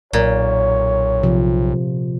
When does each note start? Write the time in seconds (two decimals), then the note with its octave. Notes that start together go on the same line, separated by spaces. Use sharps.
0.13 B1 A#2 C#5
1.23 C3 F3